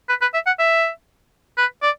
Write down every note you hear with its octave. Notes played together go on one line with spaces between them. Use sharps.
B4
B4
E5
F#5
E5
B4
D5